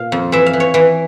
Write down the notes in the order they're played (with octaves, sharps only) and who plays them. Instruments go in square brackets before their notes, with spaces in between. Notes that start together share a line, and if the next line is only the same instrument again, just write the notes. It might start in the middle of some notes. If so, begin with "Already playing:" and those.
Already playing: [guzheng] A#2 F5
F2
E3 E5
F5
E3
C#5
E3